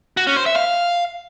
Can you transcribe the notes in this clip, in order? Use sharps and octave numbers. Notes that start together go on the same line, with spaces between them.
F#4
C#4
C5
E5
F5